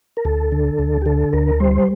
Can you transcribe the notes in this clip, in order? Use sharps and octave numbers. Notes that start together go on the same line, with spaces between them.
A#4
D2 A4
D3
D2
G4
D3 A4
D2 A#4
G3 C5